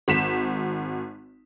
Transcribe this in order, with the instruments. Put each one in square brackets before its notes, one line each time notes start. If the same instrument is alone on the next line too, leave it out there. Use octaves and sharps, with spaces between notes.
[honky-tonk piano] G#1 B6 E7